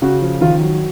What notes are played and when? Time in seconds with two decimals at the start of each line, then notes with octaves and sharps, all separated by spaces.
0.02 C#3 F#4
0.21 F3
0.41 D#3 F4
0.61 F#3